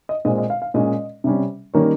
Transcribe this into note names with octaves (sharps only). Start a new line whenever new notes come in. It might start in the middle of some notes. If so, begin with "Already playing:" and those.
D#5
A#2 G#3 C4 D#5
D#5
F5
F5
A#2 G#3 C#4 D#5
C3 G3 C#4
D#3 G3 A#3 C#4 C#5